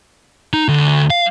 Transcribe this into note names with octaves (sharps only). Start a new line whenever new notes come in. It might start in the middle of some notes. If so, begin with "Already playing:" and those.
D#4
D2
F5